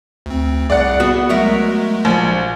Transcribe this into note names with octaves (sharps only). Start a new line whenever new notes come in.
D2 C4
C2 G#4 D5 F#5
B3 F#4
F#3 G#3 A3 A#4 E5
A#1